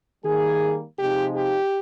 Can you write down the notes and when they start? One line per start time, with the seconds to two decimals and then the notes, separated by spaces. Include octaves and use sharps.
0.25 D#3 G3 A#3 G#4
0.99 C3 F3 G#3 D#4 G4
1.36 G4